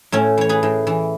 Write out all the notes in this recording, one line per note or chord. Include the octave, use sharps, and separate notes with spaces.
A2 A3 C#4
E3 C#5
G#4 B4
A2
E3